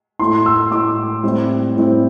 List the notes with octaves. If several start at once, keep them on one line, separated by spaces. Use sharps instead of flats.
A2 A3 E4 C6
E6
A2 A3 E4 D6
A2 G3 C4 E4
A2 G3 C4 E4